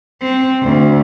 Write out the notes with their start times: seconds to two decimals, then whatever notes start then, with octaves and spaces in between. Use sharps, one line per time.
0.22 C4
0.63 D2